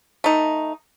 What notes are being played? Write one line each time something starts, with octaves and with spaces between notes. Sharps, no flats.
A3 D#4